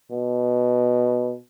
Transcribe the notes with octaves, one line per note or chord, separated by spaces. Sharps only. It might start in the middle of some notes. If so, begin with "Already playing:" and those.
B2